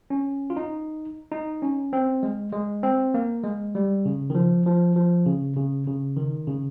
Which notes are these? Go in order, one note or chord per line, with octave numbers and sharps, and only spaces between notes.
C#4
F4
D#4
D#4
C#4
C4
G#3
G#3
C4
A#3
G#3
G3
C#3
D#3
F3
F3
F3
C#3
C#3
C#3
D#3
C#3